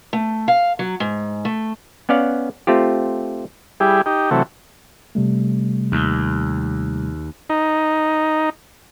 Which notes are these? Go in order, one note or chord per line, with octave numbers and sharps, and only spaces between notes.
A3
F5
F#3
G#2
A3
B3 C#4 D5 F5 F#5
A3 C4 F4 G4
G3 E4 G4 G#4
D#4 G4
C3 E3 F#3 A3
C3 G3 A3
D#2
D#4